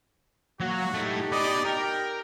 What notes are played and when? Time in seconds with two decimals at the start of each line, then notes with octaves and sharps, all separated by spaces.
0.60 F#3 A#3 F#4
0.94 A3 D#4 E4 G4
1.32 B3 D5 D#5
1.65 A#4 G5